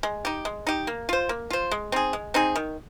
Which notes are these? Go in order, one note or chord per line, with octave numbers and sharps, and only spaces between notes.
G#3
D#4 G4
G#3
D#4 G4
A#3
F4 C5
A#3
F4 C5
G#3
C4 D#4 G#4
G#3
C4 D#4 G#4
D#3